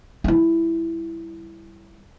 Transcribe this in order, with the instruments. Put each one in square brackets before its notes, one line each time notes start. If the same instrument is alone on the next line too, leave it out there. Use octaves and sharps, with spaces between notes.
[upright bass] G3 E4